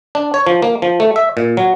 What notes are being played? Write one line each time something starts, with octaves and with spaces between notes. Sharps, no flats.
D4
C#5
F3
A#3
F3
A3
E5
A#2
F#3